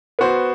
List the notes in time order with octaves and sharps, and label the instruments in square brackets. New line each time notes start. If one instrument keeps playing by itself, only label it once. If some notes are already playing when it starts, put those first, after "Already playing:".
[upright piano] B3 F#4 C5